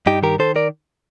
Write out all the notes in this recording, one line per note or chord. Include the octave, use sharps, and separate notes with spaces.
G2 D#4 G4
D#3 G4 A#4
D#3 A4 C5
A#4 D5